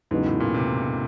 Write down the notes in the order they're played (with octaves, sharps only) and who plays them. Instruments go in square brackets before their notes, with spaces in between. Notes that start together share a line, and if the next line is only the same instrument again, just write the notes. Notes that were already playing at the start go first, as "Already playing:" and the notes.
[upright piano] E2 C#3 F#3 B3 D#4 [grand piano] G#2
[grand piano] A2
A#2
C3